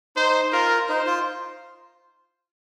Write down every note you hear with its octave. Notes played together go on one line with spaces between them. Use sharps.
D#4 C5
F4 A#4
D#4 C5
F4